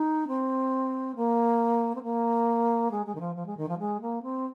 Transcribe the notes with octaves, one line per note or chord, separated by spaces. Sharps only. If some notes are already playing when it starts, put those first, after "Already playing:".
Already playing: D#4
C4
A#3
C4
A#3
G#3
G#3
D#3
F3
F3
G#3
D#3
F3
G#3
A#3
C4